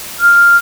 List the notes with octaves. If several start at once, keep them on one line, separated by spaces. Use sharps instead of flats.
F6